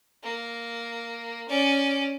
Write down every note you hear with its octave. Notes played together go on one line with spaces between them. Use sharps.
A#3
C#4 D5